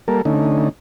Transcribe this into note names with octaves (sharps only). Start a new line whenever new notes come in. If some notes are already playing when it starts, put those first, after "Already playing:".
G3 A#3 A4 A#4
D3 A3 C#4 D#4